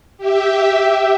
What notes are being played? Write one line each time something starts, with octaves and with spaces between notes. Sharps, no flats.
G4 E5